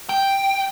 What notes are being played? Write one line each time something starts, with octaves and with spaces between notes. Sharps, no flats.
G5